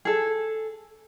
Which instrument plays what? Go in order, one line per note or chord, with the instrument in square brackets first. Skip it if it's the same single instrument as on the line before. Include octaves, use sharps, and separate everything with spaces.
[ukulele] G#4 A4